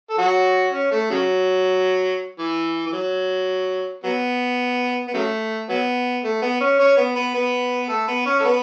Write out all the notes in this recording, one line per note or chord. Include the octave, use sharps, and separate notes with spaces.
A4
F#3 F#4
C#4
A3
C#3 F#3
E3
E3
F#3
F#3 B3
B3
C#3 F#3 A3
F#3 B3
A3
B3
C#4
C#4 C#5
B3 B4
B3 B4
B3 B4
A3 A4
B3 B4
C#4 C#5
A4
B3 B4